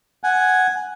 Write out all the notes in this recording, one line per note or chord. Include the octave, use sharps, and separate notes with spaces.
F#5 G#5